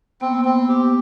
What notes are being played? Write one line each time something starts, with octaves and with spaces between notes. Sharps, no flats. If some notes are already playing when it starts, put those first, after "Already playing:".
B3 C4
A#3
B3
C4
G4